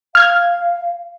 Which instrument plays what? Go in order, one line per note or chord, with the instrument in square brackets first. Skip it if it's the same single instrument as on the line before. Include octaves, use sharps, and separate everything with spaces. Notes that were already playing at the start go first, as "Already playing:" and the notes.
[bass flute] F5 [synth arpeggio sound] F6 G#6